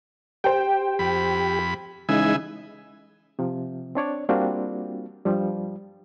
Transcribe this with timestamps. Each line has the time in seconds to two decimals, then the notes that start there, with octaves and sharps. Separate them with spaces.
0.44 G4 C5 G5
0.99 F2 B5
2.09 C#3 E3 G#3 D#4 E5 G#5
3.39 C3 F3
3.95 C4 D4 C#5 D5
4.29 G3 A#3 C4 D4 F4 F#4
5.25 G2 F3 G3